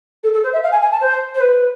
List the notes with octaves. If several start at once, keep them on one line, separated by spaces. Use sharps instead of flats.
A4
A4
C5
E5
F5
G#5
G#5
A5
C5
C5
B4